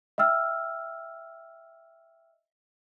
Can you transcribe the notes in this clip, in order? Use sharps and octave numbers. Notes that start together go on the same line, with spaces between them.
D#5 E5 G5 E6 F6